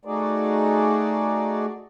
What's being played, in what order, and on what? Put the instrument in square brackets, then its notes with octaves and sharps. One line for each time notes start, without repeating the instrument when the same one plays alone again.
[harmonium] A3 D#4 F#4 G#4 D5